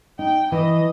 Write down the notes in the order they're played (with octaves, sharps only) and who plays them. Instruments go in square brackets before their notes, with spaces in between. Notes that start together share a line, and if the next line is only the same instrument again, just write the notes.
[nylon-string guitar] D#4 [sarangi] G5
[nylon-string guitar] E3 [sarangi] D#5